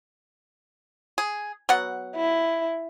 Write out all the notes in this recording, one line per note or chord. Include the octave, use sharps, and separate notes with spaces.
G#4
F#3 B3 F#5
E4